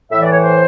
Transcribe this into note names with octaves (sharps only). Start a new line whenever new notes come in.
A2 E3 E5
D5
C#5
C5